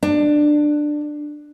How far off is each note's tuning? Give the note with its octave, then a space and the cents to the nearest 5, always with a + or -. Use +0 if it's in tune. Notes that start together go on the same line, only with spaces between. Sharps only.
D4 +15